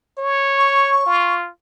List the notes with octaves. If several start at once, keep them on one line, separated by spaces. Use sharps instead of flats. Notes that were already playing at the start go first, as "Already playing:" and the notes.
C#5
C#6
F4